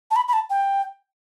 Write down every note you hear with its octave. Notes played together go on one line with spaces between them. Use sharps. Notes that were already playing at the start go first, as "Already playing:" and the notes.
A5
B5
B5
A5
G5